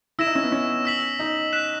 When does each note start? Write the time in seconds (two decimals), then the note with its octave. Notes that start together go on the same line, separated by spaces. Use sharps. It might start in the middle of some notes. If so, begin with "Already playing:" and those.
0.19 E4 E6 A#6 E7
0.27 D#4
0.35 C#4
0.43 B3
0.52 C#4
0.85 E6 B6 F#7
1.19 D#4
1.53 F#6 B6 E7